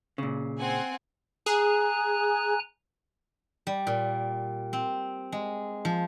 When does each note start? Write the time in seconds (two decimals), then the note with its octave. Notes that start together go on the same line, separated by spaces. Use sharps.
0.18 A#2 C#3
0.59 C4 F#5 G#5
1.46 G#4 G#5 A#5 F#6
3.67 G3
3.87 A#2
4.73 C4
5.32 G#3
5.85 F3